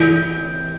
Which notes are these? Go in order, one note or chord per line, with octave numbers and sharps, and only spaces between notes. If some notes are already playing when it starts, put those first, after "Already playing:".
Already playing: E3 G6